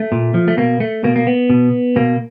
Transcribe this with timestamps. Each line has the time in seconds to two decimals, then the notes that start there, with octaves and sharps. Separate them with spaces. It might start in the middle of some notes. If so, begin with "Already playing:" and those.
Already playing: A3
0.12 A#2
0.34 F3
0.48 A3
0.57 B2 A#3
0.80 A3
1.04 B2 A#3
1.16 A#3
1.27 B3
1.50 B2
1.96 B2 A#3